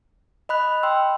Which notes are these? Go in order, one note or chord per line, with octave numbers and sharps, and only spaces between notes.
D#5 B5 F#6
G5 C6 E6